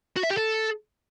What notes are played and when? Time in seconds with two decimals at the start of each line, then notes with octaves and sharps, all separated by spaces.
0.16 F#4
0.23 E5
0.30 G4
0.37 A4